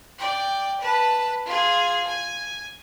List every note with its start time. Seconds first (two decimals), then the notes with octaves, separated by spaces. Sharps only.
0.18 D5 G5
0.80 B4 A5
1.46 F4 G#4
2.07 G#5